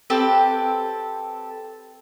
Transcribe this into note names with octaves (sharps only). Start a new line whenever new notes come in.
C4 G4 A4 B4